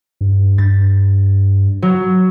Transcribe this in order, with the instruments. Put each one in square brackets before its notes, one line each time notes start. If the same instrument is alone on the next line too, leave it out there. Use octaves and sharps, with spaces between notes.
[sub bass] G2
[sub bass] G2 [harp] A6
[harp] F#3